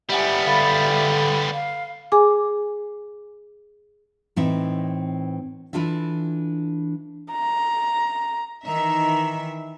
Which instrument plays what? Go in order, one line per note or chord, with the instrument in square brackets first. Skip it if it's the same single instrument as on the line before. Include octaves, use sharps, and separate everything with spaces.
[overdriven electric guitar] G3 B3 [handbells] G4 F#5 G#5 [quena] E5
[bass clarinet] D3 [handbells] F5 B5 A6
[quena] F5
[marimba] G#4 G#5 D6
[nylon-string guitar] A2 E3 C4 D#4 E5
E3 D4 F4 A4 E5
[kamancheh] A#5
[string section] D#3 E3 E5 [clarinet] A#5